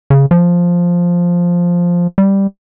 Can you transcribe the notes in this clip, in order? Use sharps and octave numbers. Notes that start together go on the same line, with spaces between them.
C#3
F3
G3